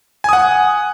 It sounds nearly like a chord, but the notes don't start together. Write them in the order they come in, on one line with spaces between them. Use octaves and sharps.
G#5 D#6 F#5